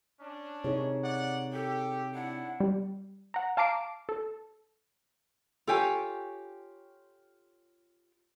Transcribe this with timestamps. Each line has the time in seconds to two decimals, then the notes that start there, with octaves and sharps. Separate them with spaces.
0.20 C#4 D4
0.64 C3 D#4 G#4 C#5
1.04 D5 F#5
1.53 G4 A4
2.15 D4 E4 F#5
2.60 G3
3.34 F#5 A#5
3.57 F5 A5 A#5 D6 C7 D7
4.09 A4
5.67 F4 G4 A4 C#5 G#5